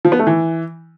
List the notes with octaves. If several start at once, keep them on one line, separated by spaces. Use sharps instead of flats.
F3
B3
A3
E3